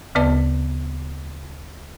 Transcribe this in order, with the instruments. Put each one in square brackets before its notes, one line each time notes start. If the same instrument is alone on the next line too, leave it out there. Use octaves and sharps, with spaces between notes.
[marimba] D2 C#3 B3 B4 D5 A5